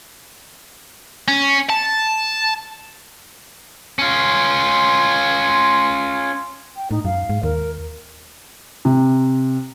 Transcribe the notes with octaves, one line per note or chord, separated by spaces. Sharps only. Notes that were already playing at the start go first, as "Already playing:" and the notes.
C#4
A5
C#4 F4
G5
A2 D#4
F#2 F5
G#2
D#2 A#4
C3